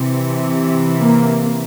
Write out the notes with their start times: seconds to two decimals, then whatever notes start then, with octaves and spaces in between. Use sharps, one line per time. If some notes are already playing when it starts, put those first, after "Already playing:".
Already playing: C3 E3
0.99 A#3